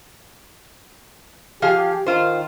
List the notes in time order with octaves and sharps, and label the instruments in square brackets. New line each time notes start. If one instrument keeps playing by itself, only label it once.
[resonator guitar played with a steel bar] F3 G#4 F5 [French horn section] G4
[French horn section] D#3 [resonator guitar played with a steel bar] F4 C5